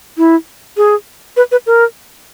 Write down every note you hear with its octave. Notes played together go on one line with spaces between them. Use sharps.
E4
G#4
B4
B4
A#4